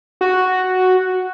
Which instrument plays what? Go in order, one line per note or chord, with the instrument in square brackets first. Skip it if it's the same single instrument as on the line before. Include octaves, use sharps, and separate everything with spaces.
[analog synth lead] F#4